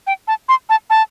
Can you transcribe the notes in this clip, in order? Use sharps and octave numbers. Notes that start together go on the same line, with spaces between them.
G5
A5
C6
A5
A5